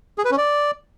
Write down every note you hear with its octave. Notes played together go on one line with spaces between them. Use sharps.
G#4
B4
C#4
D5